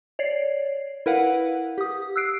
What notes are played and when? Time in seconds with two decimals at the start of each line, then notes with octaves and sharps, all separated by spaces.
0.19 C#5 D5 C7
1.06 E4 A#4 B4 F5 F#5
1.78 G4 D#6
2.16 E6 F#6 C7 D7